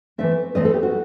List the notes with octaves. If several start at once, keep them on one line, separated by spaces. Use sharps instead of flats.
E3 A3 C4 E5
E3 A3 C4 D#5
A4
G4
F#4